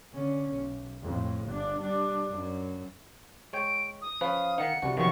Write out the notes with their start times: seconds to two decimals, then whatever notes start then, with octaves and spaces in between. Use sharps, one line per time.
0.14 D3 C#4
0.53 B1
1.03 F2 A2
1.47 G1 D4
1.81 G3 D4
2.34 F#2
3.53 G#3 C#5 G5 D7
4.02 D#6
4.21 F3 C#4 B4 F5
4.58 D#3 D#4 F#5 C#7
4.82 C2 F#4
4.97 B1 D#3 F3 B3 C#6